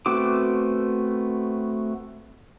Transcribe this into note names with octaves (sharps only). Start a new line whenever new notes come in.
A3 B3 C4 F#4 D6